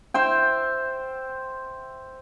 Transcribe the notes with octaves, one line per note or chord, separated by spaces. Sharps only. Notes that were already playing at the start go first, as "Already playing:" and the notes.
C5 E5 G5